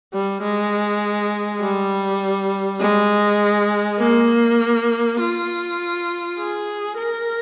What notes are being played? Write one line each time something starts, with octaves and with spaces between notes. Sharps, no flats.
G3
G#3
G3
G#3
A#3
F4
G#4
A#4